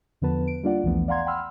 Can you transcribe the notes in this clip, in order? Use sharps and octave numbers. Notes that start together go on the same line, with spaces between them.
E2 D3 F3 B3 B4 A5
D7
G3 A#3 D4 F4 D5 F#5
B1 E2 E3 F3 A3 B3
D5 F5 F#5 A#5 C6 G#6
F#5 G5 B5 C6 E6 F6